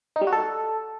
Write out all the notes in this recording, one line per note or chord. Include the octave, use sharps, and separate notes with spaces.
D#4
G3
F#4
A4